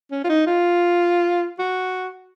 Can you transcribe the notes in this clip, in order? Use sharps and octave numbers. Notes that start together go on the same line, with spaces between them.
C#4
F4
D#4
F4
F#4